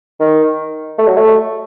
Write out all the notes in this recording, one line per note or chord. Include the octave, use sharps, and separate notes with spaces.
D#3
A3
F#3
A3